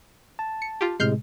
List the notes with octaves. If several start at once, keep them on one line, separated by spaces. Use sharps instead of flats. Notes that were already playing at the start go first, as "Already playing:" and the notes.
A5
C#7
F4 G4
A2 C3 G#3 F6 G6 C7